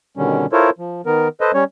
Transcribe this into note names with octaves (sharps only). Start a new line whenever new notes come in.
B2 D3 D#3 G3 C#4
E4 F4 A4 A#4 C5 C#5
F3
D#3 B3 A#4
A4 B4 C5 D#5
G3 C#4 C#5